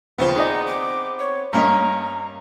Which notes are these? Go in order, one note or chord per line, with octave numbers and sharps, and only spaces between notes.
D#2 C#3 F3 B3 C4 C5
D#4 G#4 D5 D#5
D6
C#5
G2 A#3 C#4 D#5 A#5